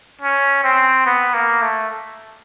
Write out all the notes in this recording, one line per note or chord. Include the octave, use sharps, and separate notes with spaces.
C#4
C4
B3
A#3
A3